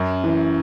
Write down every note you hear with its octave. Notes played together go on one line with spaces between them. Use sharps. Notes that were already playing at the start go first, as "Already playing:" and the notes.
Already playing: F#2
E3